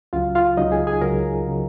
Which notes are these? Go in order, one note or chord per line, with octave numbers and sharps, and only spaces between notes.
C#2 C#3 F#3 F4 F5
F4 F5
C#2 C#3 F#3 D#4 D#5
G#4 G#5
G#4 G#5
C#2 C#3 F#3 A#4 A#5
C#3 F#3